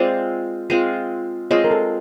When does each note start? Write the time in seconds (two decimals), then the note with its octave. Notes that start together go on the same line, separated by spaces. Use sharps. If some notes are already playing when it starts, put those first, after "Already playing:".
Already playing: G#3 C4 F4 C5 D5
0.70 G#3 C4 F4
1.51 G#3 C4 F4 C#5 D#5
1.64 A#4
1.71 A4